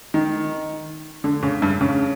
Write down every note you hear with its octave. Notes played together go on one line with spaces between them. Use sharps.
D#3
D3
C#3
G2
C#3